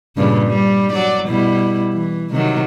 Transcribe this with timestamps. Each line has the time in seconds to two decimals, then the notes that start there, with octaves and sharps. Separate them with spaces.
0.17 G2 A#2 C#3
0.47 G3
0.92 F#3 D5
1.28 B2 G3 E4
1.93 E3
2.31 C3 D#3 F#3